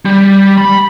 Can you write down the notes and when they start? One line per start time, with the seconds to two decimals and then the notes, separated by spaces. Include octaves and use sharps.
0.05 G3
0.58 B5